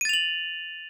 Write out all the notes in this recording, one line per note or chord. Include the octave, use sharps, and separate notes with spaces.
A6 D#7 F7 F#7